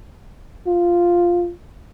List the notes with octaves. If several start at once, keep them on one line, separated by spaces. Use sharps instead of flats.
F4